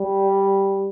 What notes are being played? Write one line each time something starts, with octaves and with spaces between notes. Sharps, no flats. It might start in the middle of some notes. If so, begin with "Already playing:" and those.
Already playing: G3